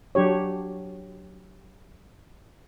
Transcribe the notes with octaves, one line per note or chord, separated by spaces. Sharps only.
F#3 D4 G4 C#5